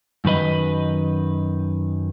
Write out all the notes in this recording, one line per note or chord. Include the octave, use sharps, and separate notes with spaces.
F#2 D#3 B4 D#5